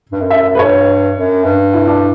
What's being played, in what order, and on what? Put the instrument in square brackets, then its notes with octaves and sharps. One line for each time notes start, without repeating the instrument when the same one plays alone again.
[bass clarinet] G2
F#2
[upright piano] E5
B4
[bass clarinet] G2 [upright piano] C#5
[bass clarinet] F#2
G2
[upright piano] E4
D4